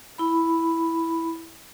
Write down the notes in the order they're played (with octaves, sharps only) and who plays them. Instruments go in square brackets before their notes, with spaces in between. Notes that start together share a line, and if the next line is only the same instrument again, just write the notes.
[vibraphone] E4 B5